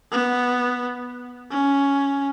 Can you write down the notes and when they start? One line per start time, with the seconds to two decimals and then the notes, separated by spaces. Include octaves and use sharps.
0.11 B3
1.51 C#4